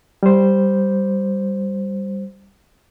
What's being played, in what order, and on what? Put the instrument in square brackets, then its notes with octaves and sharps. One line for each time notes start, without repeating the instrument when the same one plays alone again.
[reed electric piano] G3 C5